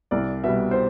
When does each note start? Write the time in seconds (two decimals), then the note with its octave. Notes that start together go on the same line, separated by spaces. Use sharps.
0.11 C2 D5
0.44 B2 G3 E5
0.71 C5